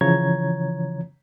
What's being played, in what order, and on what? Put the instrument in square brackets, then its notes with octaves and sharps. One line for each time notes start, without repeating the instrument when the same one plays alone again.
[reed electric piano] C#3 E3 F3 C#5 A#5 G#6